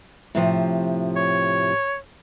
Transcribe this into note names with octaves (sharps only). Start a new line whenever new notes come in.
A2 C3 F3
C#5